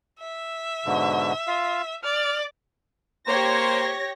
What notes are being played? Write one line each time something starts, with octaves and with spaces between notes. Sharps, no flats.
E5
G#2 B2 D3
F4 F5
D5 F6
A#3 G4 C5 C#5 A#6